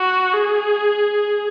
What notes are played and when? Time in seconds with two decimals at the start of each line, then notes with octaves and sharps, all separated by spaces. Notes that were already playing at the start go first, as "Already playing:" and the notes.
Already playing: F#4
0.33 G#4